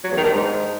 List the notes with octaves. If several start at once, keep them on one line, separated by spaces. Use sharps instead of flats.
F#3
E2
D#3
G2
G#2